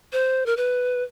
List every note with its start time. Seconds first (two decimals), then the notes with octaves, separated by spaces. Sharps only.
0.13 C5
0.46 A#4
0.57 B4